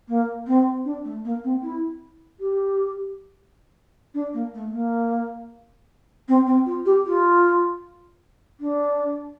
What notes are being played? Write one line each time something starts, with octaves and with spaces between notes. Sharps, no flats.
A#3
C4
D4
A3
A#3
C4
E4
G4
D4
A#3
A3
A#3
C4
C4
F4
G4
F4
D4